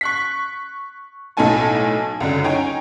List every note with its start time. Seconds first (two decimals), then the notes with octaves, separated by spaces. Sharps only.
0.01 C#6 F#6 B6
1.37 B1 A2 D#4 A4 G#5 A5
2.21 C#2 F#2 D3
2.44 D#4 C#5 G5 G#5 A#5